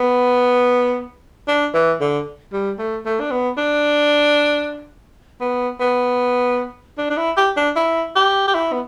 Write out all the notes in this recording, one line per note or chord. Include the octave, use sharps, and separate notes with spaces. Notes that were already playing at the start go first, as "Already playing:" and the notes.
Already playing: B3
D4
E3
D3
G3
A3
A3
D4
B3
D4
B3
B3
D4
D4
E4
G4
D4
E4
G4
G4
E4
B3